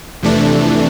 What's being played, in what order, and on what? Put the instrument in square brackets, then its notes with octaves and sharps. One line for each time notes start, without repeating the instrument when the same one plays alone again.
[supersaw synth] F2 C3 E3 A3 D4